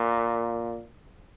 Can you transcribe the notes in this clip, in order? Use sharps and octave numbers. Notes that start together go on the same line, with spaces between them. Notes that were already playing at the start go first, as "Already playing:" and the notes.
Already playing: A#2